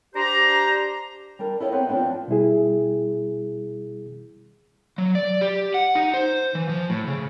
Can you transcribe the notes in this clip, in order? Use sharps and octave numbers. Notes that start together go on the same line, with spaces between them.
D4 G4 C5 A#5
G3 D4 A#4
E4 F4 G4 A4 C#5 D#5
B3 C4 D#4 B4 C#5
F3 F#3 B3 C4 D4
B2 G3 E4 G#4
F#3
D5
G4
F#5
D#4
C5
E3
F3
A2
C#3